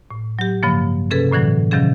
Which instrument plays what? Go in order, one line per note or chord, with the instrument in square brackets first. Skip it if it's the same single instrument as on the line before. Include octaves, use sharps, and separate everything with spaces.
[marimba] A2
F#3 G4
G2 C#3 F3 A#3
C3 C#4 G#4 A4 B4
F#2 A2 D3 E3 F#3
C3 D#3 F3 F#3 C#4 G#4